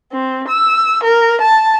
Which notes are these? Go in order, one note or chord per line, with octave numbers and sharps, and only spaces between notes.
C4
E6
A#4
A5